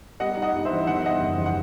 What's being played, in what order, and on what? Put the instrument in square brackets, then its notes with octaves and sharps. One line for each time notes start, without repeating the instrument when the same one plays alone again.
[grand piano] G3 [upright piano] D#5 F#5
[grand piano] D#4
[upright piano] D#5 F#5
[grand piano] G2
[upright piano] C5 E5
[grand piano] E3
[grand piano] D#3 [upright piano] F#5
[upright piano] E5
[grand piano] G3 [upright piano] D#5 F#5
[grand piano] F#1
E2
[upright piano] F#5